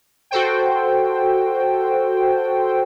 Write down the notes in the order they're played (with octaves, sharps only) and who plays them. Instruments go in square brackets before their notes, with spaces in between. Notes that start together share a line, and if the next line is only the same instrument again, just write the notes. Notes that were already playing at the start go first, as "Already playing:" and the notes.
[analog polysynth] F#4 A4 C5 G5